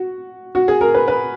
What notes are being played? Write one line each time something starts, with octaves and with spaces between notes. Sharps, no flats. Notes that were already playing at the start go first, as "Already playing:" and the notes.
Already playing: F#4
F#4
G#4
A#4
B4
B4